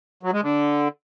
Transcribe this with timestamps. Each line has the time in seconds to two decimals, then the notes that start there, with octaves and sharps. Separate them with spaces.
0.23 F#3
0.33 G#3
0.43 D3